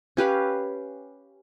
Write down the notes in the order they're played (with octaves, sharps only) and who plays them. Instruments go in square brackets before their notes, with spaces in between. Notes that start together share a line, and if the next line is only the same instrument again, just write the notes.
[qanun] C#4 G4 B4 F5